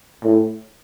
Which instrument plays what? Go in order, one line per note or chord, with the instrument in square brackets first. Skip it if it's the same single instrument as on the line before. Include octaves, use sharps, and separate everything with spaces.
[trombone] A2